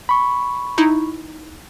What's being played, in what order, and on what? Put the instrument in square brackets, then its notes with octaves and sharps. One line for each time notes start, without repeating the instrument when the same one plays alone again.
[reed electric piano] B5 C#6
[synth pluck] D#4 E4